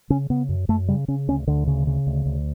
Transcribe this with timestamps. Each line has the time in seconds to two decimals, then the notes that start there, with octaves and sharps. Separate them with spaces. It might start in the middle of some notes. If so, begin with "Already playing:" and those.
0.10 C#3 C#4
0.30 C#3 B3
0.49 F#2
0.69 F#2 A3
0.88 C#3 G3
1.08 C#3 C#4
1.28 D2 C#4
1.47 D2 D3
1.67 C#3
1.87 C#3
2.07 D2
2.26 D2